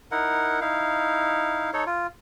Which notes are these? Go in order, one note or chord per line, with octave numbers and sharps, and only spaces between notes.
D#4 E4 A#4 F#5
D#4 E4 F5
D#4 A4 C#5
F4